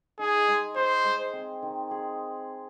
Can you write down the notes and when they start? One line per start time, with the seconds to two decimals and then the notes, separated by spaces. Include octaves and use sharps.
0.19 D#4 G#4
0.48 G#3
0.76 G#4 C5
1.04 G#3
1.33 C4
1.63 D#3
1.91 G#4